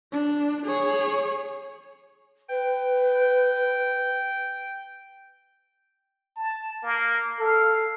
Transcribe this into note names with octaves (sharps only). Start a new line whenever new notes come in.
D4
G#4 C#5
B4 G5
A5
A#3
A4 F5